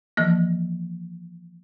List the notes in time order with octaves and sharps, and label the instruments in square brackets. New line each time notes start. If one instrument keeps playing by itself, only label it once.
[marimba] E3 F3 A#3